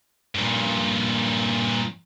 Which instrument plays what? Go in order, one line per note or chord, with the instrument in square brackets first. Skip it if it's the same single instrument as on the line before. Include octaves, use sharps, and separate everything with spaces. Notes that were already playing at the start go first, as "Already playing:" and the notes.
[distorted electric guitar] G2 A#2